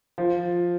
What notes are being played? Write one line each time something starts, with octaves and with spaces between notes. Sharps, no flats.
F3